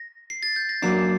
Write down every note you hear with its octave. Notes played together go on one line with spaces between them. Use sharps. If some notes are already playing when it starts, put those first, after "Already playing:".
Already playing: A#6
C7
A6
G6
A#6
F#2 F#3 A#3 D4 C7